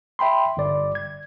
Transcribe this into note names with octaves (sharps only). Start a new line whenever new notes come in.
E5 G5 B5 C6
G1 D5
G#6